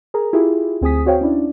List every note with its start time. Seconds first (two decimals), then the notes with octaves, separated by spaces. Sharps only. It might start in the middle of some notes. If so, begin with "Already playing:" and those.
0.14 G#4 A#4 A#5
0.33 E4 F4 G4 G#4
0.81 D2 C4 G#4 G#5 D#6 B6
1.06 C4 F#4 C5 C#5 F5 G5
1.21 C#4 D4 E4 D5